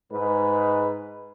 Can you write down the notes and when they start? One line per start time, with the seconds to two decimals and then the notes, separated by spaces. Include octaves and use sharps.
0.11 G#2 G#3 B4